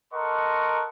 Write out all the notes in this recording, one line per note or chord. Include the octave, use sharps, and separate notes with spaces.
A4 A#4 D#5 F#5 C6 C#6